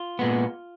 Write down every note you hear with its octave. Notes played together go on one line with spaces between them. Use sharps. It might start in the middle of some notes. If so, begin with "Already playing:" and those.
Already playing: F4
A#2 G#3 B3